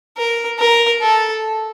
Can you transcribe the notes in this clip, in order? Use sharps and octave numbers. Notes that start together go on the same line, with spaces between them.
A#4
A#4
A4